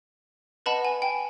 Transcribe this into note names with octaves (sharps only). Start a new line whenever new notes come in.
B4 D#5 F#5 A5 B5
G#5
G5